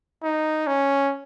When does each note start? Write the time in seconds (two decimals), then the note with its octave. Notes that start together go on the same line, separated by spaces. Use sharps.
0.23 D#4
0.67 C#4